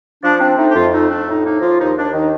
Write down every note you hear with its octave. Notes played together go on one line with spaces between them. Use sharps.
F3 D4
C4 D4
A3 D#4
G4
F2 F4
A3 D#4
F2 D4
A2 D#4
A#3 D#4
F3 F4
D#2 D#4
D#2 D4
D#3 D#4